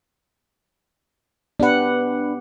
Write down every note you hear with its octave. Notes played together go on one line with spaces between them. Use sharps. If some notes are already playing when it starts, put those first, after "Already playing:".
B3 D4 G4 B4 F#5